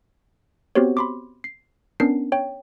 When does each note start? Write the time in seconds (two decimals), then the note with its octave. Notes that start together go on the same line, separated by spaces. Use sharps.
0.75 B3 C4 F#4 G4 C5 C#5
0.97 B5 C6 D6
1.44 C7
2.00 B3 C#4 D4 A#4 C7
2.32 C#5 G5